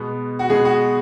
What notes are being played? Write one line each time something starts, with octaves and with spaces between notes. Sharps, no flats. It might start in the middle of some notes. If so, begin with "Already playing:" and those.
Already playing: B2 G#3 B3
F#4
B2 G#3 B3 G#4
F#4